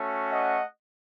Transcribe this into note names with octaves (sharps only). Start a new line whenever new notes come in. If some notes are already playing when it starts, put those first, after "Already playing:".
Already playing: A3 C#4 F#4
D#5 F#5